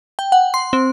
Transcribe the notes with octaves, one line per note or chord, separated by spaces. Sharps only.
G5
F#5
C6
C4